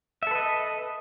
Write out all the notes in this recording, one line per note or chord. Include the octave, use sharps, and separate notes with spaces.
A4 B4 D#5 E5